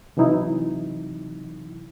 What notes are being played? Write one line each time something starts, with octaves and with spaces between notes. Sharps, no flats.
C3 E3 F#3 D#4 E4